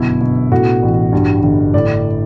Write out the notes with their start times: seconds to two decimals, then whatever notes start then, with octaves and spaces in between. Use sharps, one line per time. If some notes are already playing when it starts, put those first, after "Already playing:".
Already playing: G1 F#2 B2 E4
0.21 B2
0.52 A2 F#4
0.82 A1
1.13 G2
1.43 G1
1.74 A2 D5